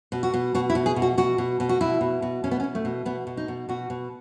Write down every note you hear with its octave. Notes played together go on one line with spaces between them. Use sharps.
B2
F#4
B2
B2 F#4
E4
B2
G#4
B2
F#4
B2 F#4
B2
B2
F#4
B2 E4
B2
B2
B2 C#4
B3
C#4
B2
A3
B2
B2 B3
B2
D#4
B2
B2 F#4
B2